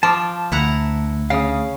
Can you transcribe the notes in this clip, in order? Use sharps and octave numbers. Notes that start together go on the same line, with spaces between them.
F3 A5 D6
D2 E4 F#5 A#5
C#3 F5 D#6